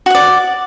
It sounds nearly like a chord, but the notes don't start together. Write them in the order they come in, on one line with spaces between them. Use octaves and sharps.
F#4 F#5 D5